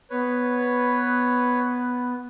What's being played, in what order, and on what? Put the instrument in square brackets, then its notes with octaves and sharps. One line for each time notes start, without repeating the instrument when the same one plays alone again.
[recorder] B3 [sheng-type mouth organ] B4 C#5